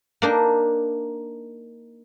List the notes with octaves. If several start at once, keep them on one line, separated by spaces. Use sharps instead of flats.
A#3 D4 D#4